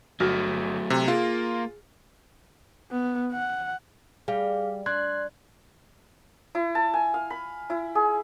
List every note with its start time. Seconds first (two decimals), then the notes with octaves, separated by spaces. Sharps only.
0.20 G1 F#3 A3 F#4 F6 A#6
0.90 C3
1.08 A#3 F4 G#4
2.91 B3
3.32 F#5
4.28 G3 G#4 F5
4.86 D4 C6 F#6 G#6
6.55 E4
6.75 A5
6.94 G#5
7.14 F5
7.30 B5
7.70 E4
7.95 G#4